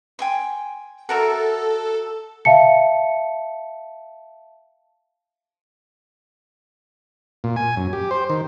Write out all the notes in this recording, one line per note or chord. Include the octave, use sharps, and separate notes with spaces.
G5 G#5 C6
F#4 A4 A#4 E5
E5 F5 A5 C#7
A#2
G#5
F#2
G4
C5
D#3